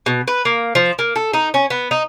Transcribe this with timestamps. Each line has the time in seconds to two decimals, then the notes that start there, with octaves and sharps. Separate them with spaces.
0.06 B2
0.28 B4
0.45 A#3
0.75 F3
0.99 A#3
1.16 A4
1.33 D#4
1.54 C#4
1.70 B3
1.91 D#4